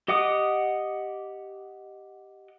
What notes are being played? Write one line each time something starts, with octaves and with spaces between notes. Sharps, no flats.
G4 D#5 F#5 D6 D#6